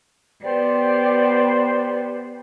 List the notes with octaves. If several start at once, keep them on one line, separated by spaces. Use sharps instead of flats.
B3 G4 C5 D5